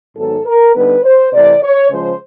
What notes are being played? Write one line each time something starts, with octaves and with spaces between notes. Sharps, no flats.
G#2 D#3 F#3 B3 A4
A#4
D3 G3 B3 D#4 B4
C5
C3 E3 A3 D5
C#5
C#3 F3 G#3 C5